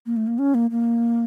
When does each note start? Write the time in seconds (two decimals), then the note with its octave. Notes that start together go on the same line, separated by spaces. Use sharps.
0.06 A#3
0.17 A3
0.27 A#3
0.39 C#4
0.55 A#3
0.71 A#3